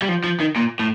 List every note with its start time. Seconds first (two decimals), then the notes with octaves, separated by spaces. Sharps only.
0.02 G3
0.09 F3
0.24 F3
0.40 D#3
0.56 A#2
0.79 A2